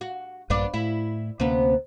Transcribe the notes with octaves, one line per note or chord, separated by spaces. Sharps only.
F#4
A#1 G2 A#2 B3 D4 D5
A2 E4
D2 C3 A#3 B3 C#4